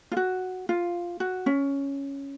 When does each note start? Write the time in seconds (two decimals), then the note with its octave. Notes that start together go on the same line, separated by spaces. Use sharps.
0.12 F4
0.17 F#4
0.69 F4
1.20 F#4
1.46 C#4